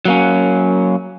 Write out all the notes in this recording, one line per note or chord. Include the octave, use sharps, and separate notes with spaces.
F#3 A#3 C#4